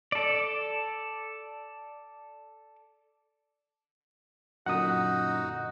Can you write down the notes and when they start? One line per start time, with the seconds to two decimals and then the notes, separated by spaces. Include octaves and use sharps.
0.12 A4 D5
4.66 F#2 A#2 D3 D#4 F#4 F#5 D#6